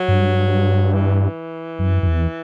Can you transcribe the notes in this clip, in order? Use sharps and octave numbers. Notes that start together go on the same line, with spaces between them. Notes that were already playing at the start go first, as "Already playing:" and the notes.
Already playing: F#3
G2
E3
F#2
F#2
E2